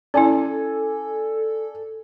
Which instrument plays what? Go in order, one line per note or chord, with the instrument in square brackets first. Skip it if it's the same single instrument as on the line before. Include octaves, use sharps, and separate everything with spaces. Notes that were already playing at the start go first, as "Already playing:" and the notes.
[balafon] C#4 E4 [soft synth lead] A4 [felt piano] D5 G#5